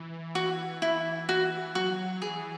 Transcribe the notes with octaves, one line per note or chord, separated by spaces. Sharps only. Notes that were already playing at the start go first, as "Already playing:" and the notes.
Already playing: E3
F#4
E4
F#4
F#3 F#4
E3 G#4